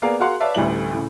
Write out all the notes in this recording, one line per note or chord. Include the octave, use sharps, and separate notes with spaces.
A#3 B3 G#4 A#4 D5 F5
F#4 G#4 A#4 F5 F#5 C6
B4 C#5 D5 E5 F5 A5
A1 D2 A2 G3 E4 F#7
A2 C#3